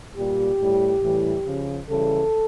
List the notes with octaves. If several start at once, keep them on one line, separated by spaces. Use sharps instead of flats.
A#2 G3 G4
A2 G3
A2 E3 G3
C#3 F3
C#3 E3 G3 A4